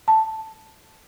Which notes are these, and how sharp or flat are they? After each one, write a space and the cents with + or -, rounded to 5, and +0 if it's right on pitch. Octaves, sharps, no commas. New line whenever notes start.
A5 +5